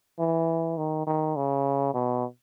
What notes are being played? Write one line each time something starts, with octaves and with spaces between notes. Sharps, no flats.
E3
D#3
D#3
C#3
B2